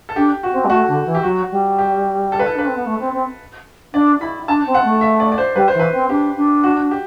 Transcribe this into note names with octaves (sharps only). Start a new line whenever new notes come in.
A4
D4 G4
F#4
C4
G3
A3 F#4
D3
E3
G4
F#3 F#4
G3
G4
A4
B4
E4 A4
D4 B4
C4
B3
A3
C4
C4
D4 D5
E4 B5
D4 A5
C4
F#5
A3
E5
D5
D5
C5
G3 B4
C5
E3
B4
C4
D4 G4
D4
F#4
G4